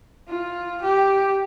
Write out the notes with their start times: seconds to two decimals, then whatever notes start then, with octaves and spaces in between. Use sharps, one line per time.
0.28 F4
0.82 G4